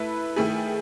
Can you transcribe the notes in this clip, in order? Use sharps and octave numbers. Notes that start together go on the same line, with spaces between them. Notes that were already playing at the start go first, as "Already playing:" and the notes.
Already playing: A3 E4 B4
D#3 A3 E4 G#4